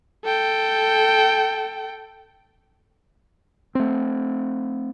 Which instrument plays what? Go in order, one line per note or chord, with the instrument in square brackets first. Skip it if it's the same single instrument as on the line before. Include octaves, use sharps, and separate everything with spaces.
[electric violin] A4 G5
[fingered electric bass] A3 C4